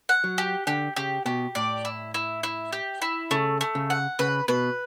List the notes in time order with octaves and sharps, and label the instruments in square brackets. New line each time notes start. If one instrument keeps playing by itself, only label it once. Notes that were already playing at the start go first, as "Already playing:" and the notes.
[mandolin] F#5
[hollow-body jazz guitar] F#3
[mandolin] G4
[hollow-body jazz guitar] D3 [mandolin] G4
[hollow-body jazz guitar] C#3 [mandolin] G4
[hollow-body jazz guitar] B2 [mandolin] G4
[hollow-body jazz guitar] A2 [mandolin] D5
[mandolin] E4
E4
E4
G4
E4
[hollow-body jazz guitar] C#3 [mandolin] A3
[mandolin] A3
[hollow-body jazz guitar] C#3
[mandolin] F#5
[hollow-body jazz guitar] C#3 [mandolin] B4
[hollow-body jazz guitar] B2 [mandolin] B4